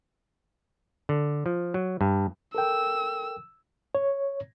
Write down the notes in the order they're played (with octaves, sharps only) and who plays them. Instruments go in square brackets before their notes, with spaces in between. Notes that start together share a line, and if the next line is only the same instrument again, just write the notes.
[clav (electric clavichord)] D3
F3
F#3
G2
[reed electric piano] A4 A#4 G5 [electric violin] E6
[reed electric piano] C#5